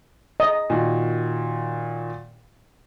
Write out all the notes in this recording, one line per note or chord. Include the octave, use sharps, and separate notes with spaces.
D#5
A#2 D#3 F#4